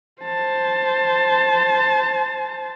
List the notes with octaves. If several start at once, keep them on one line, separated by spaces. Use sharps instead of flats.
C5 A5